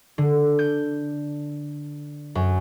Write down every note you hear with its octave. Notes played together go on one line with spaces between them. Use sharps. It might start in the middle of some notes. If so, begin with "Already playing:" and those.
D3
G6
F#2